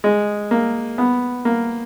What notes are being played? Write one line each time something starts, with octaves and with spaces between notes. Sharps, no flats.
G#3
A#3
B3
A#3